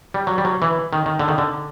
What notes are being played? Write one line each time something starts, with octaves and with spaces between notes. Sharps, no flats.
G3
F#3
G3
F#3
E3
D#3
D#3
D3
D#3
D3